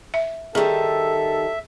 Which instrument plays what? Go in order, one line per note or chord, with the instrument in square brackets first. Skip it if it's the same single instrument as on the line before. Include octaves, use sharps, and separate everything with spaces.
[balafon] E5
[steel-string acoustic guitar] D#3 G3 [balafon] G#4 [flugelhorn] A4 [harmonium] E5